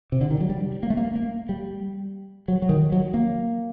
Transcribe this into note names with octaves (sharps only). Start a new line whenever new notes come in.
C3
D3
D#3
F#3
G3
A#3
A3
A#3
A#3
G3
F#3
F#3
D#3
F#3
A#3